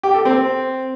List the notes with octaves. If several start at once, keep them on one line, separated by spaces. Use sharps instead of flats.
G4
A4
C4